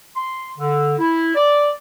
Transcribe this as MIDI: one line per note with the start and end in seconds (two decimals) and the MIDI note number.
0.15 0.50 84
0.58 0.95 50
0.99 1.34 64
1.35 1.70 74